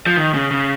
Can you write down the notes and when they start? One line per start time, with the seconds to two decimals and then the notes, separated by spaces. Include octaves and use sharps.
0.06 F3
0.17 D#3
0.34 C#3
0.51 C#3